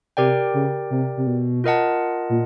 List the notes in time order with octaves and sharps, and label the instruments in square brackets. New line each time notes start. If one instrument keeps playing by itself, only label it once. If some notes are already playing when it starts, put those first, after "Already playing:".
[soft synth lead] C3 [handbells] G4 A#4 D5 G5
[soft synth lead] C#3
C3
C3
B2
[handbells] F4 A#4 D#5 F#5 A5
[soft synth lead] A#2